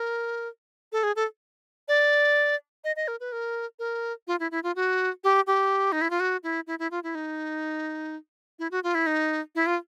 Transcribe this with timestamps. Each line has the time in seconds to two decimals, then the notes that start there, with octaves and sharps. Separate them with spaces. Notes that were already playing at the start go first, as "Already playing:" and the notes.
Already playing: A#4
0.92 A4
1.03 G#4
1.16 A4
1.88 D5
2.84 D#5
2.96 D#5
3.08 A#4
3.20 B4
3.32 A#4
3.79 A#4
4.27 F4
4.40 E4
4.51 E4
4.63 F4
4.76 F#4
5.24 G4
5.47 G4
5.92 D#4
6.01 E4
6.10 F4
6.20 F#4
6.43 E4
6.67 E4
6.79 E4
6.91 F4
7.04 E4
7.15 D#4
8.59 E4
8.71 F#4
8.84 F4
8.95 E4
9.07 D#4
9.55 E4
9.67 F4